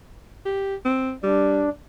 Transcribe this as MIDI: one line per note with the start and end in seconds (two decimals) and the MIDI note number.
0.45 0.75 67
0.85 1.12 60
1.24 1.66 55
1.24 1.69 62